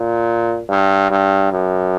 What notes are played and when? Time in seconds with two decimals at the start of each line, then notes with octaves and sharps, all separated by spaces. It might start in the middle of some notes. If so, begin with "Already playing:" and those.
Already playing: A#2
0.69 G2
1.11 G2
1.52 F#2